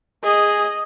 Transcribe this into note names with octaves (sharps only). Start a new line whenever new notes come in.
G#4 D#5